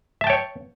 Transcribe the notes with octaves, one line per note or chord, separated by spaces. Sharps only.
C#5 E5 G5 A5